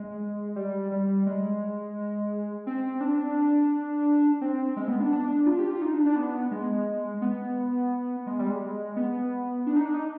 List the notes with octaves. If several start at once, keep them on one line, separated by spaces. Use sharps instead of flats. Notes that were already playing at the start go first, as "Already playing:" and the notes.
Already playing: G#3
G3
G3
G#3
C4
D4
C4
G#3
B3
D4
D4
F4
G4
F4
D#4
D4
D4
B3
G#3
B3
G#3
G3
G#3
B3
D4
D#4
D4
D#4